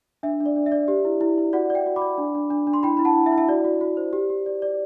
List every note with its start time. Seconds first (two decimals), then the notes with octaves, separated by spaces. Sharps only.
0.23 D4 E5
0.40 D4
0.46 D5
0.56 D4
0.66 E5
0.72 D5
0.88 G4
1.05 E4
1.21 E4
1.38 E4
1.53 F#4 D5 F#5
1.70 D5
1.75 E5 G5
1.86 F#4
1.96 B5 D6
2.02 D5
2.18 D4
2.35 D4
2.50 D4
2.67 D4
2.73 C6
2.83 E4 G5 B5
2.97 E4 B5
3.05 F#5 A5
3.16 E4
3.26 E5
3.32 E4
3.38 E5
3.48 F#4 D5
3.64 F#4
3.81 F#4
3.97 C5
4.13 G4
4.30 G4
4.46 D5
4.62 D5